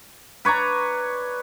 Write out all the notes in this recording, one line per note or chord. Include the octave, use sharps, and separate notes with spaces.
B4 C#5 D5 A#5